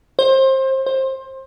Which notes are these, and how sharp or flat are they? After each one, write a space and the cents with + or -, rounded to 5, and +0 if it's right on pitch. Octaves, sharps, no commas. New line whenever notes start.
C5 +25
C5 +20